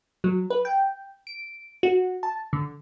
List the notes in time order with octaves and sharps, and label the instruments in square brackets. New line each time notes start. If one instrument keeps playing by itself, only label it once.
[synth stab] F#3
B4
G5
D7
F#4
A5
D3